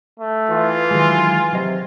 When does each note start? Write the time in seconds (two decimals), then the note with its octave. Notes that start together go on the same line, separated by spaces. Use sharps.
0.20 A3
0.50 E3 F4
0.91 D#3 F#3 G#3 G#5
1.53 C3 F#3 D#5